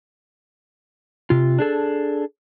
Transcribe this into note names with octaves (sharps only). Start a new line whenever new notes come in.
C3 F4
D4 G#4 A4